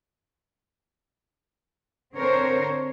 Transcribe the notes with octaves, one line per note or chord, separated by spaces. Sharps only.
D3 C4 A#4 C5 C#5